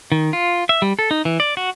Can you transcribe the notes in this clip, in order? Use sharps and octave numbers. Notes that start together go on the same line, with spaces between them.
D#3
F4
E5
G3
A4
D#4
E3
D5
F#4